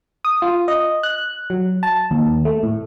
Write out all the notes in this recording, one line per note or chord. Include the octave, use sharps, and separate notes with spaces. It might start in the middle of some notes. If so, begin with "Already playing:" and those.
D#6
F4
D#5
F#6
F#3
A5
D#2
A3
A2